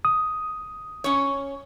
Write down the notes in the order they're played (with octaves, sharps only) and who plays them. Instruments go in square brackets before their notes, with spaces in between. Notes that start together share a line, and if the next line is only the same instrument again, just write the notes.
[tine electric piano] D#6
[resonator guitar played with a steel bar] C#4 C#5